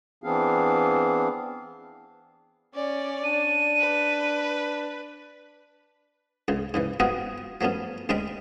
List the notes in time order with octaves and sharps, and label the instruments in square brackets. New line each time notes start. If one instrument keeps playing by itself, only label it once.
[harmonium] E3 B3 C4 D4 G#4 F5
[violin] C#4 D5
[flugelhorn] D4 [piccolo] D#7
[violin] B4
[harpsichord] C#2 C#3
G#2 C#3 E3
B3 C4 F4 F#4 G#4 D#5
F3 F#3 A3 B3 C#4
D2 G#3 C#4 D#5 G5 B5